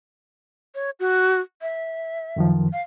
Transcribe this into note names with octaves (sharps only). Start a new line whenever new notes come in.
C#5
F#4
E5
F#2 D#3 F3
F5